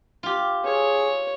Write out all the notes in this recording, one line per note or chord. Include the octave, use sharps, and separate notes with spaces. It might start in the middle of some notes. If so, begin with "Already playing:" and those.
F4 G4
G#4 C#5